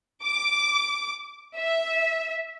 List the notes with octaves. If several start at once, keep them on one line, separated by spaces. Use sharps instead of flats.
D6
E5